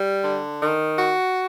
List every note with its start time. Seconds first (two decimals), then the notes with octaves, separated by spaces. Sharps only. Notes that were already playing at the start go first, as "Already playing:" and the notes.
Already playing: G3
0.24 D3
0.61 D#3
0.98 F#4